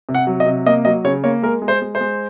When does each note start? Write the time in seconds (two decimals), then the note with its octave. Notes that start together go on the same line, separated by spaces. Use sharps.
0.09 C3
0.15 F#5
0.27 F#3
0.40 D#5
0.46 C3
0.66 A#3 D#5
0.85 F#3 D#5
1.04 C#3 C#5
1.24 A#3 C#5
1.42 G#3 A#4
1.62 G#3
1.68 C5
1.82 G#3
1.95 C5
2.01 G#3